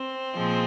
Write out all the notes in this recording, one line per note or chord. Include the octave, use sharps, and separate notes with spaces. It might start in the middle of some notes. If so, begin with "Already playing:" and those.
Already playing: C4
A#2 F3 G#3